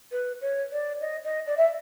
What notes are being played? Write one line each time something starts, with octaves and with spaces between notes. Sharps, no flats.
B4
C#5
D5
D#5
D#5
D5
E5